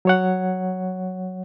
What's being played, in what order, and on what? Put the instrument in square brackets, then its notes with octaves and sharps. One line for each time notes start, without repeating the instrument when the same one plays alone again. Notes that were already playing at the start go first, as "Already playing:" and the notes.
[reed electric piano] F#3 C#5 F#5